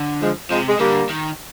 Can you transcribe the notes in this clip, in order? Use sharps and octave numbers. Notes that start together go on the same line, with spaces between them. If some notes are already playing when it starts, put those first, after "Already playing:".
Already playing: D3
F3 G#3
C3 F3 G#3
G#3
D3 G3 A#3
D#3